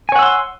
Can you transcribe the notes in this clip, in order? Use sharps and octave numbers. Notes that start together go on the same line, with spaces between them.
C#5 F#5 G#5 C6 E6